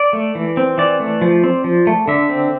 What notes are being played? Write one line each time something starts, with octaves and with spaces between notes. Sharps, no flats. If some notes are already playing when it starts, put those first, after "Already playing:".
Already playing: D5
A3
E3
C4
E3 D5
A3
F3
C4
F3
A3
D3 E5
C4